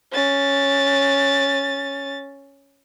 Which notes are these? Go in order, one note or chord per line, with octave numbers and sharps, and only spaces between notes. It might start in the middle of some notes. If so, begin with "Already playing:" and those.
C#4 A6